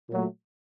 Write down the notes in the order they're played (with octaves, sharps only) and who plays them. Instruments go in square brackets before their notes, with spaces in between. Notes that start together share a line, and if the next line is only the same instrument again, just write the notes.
[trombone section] A#2 F#3 A3